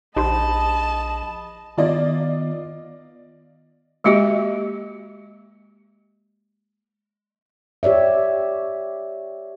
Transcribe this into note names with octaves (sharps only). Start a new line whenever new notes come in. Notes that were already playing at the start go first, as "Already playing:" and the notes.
A#1 D#4 G4 C5 D#5 A5 B5
D#3 B3 F4 D5 D#5
G#3 A#3 F#4 G4 D#5
G4 C#5 D5 E5